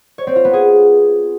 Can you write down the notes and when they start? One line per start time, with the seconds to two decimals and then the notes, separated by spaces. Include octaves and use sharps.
0.18 C#5
0.27 C4
0.36 F4
0.45 B3
0.53 G#4